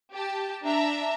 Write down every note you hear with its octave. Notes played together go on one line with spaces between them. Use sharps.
G4 A5
D4 E5 A#5